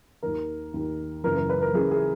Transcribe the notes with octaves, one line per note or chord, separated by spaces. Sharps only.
D#2 D#3 A#4
D#2 D#3
F#1 F#2 E3 A#4
A#4
B4
A#4
F#1 F#2 E3 G#4
G#4